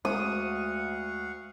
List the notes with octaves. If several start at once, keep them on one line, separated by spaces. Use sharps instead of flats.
D2 G#3 F5 F#5 C#6 D#6